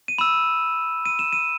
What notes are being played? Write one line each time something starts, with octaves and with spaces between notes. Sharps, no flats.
D#7
B5 E6 E7
D#7
E7
D#7